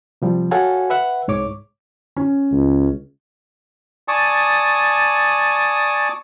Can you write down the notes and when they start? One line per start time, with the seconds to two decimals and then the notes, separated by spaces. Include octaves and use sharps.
0.22 C3 F3 G3
0.51 F#4 A4 C#5 F5 F#5 G#5
0.90 B4 E5 F#5
1.28 C2 G#2 C#5 D6
2.16 C#4
2.52 C#2
4.08 D5 G#5 A5 C#6 D#6